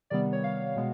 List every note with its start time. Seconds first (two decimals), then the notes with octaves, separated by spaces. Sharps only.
0.10 C3 D#3 G3 B3 D5
0.33 C#5
0.44 F5
0.76 B2 G#3 B3